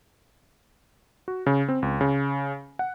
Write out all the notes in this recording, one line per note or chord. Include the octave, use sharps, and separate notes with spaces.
F#4
C#3
C4
C#2
C#3
F#5